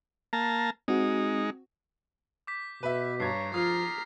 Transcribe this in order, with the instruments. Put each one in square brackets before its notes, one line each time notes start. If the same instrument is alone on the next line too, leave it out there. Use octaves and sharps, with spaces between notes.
[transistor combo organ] A#3 A5 A#5
[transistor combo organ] G#3 D#4 [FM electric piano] C4 F#4
[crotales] D6 G6 B6
[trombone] B2 [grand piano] B4 E5
[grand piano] G2 G#6 [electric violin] C#5 A#5 [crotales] A6 C7
[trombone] F3 [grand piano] F4 [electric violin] A#5 C7 [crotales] D#6 F6